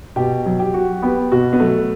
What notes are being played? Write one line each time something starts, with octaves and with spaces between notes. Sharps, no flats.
B2 G4
F#3
G4
F#4
B3 G4
B2 F#4
B3
F#3 A3